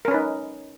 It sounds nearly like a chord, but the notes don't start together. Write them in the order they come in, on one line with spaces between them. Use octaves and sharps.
A#4 C#4 B4 D#4